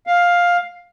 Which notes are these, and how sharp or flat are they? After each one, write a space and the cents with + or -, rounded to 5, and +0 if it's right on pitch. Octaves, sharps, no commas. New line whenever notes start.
F5 +10